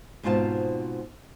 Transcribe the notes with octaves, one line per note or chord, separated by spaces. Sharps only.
G#2 B2 C4 F4 G#5 A5